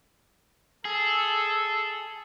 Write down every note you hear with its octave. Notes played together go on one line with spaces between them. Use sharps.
G#4 A4